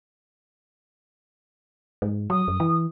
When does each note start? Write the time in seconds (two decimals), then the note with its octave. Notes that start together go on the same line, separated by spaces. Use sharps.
2.02 G#2
2.30 F#3 D#6
2.48 F#2
2.60 E3